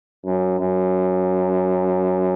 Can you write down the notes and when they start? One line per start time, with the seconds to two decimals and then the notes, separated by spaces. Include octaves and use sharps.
0.25 F#2
0.60 F#2